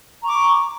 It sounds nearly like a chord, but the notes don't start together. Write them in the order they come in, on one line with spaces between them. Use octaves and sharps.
A#5 C#6 D6